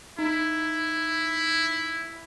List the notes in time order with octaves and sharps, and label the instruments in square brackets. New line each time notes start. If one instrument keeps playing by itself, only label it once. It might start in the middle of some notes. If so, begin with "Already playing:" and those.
[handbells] D#4 [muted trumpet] E4